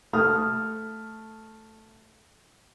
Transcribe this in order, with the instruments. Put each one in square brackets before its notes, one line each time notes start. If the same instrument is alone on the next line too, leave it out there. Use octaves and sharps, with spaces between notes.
[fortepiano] A3 D#6 F6